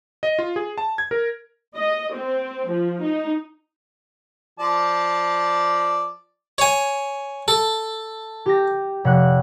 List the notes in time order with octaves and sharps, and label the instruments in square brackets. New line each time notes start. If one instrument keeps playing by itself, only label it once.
[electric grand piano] D#5
F4
G#4
A5
G#6
A#4
[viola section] D#5
C4
F3
D#4
[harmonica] F3 D5 A5
[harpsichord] C#5 G#5
A4
[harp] G4 A#6
F1 F#5 F#6